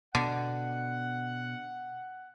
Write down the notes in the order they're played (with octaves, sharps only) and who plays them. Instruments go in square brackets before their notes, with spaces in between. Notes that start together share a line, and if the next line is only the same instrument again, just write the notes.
[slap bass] B2 B3 [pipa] D3 [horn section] F#5